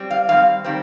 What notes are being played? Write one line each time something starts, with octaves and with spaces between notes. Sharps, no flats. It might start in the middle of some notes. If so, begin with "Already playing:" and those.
Already playing: G3 C4
F5
D#3 G3 C4 F5
D#3 G3 C4